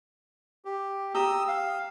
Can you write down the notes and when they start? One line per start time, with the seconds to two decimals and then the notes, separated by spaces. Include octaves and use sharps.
0.65 G4
1.15 G4 A#5 D#6 E6
1.48 F5